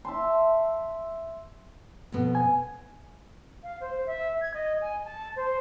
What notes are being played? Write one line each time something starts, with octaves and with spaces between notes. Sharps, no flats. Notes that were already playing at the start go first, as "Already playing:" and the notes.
E5 A5 C6
F2 B2 B3
G#5
F5
C5
E5
G#6
D#5
G#5
A5
C5